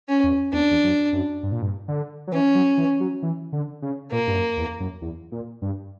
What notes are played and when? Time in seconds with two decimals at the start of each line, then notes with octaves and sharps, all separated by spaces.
0.08 C#4
0.23 E2
0.53 E2 D4
0.71 E2
0.84 F#2
1.13 F#2
1.43 G2
1.52 A#2
1.62 G2
1.88 D3
2.27 F#3
2.32 E3 C#4
2.55 F#3
2.78 E3
3.00 F#3
3.22 E3
3.52 D3
3.82 C#3
4.12 A#2 A#3
4.27 G2
4.34 F#2
4.57 E2
4.80 F#2
5.02 E2
5.32 A#2
5.62 G2